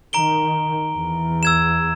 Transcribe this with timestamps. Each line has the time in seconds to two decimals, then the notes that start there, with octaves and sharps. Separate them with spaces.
0.13 D#3 A#5 D7 G7
0.94 E2
1.43 E6 G#6 E7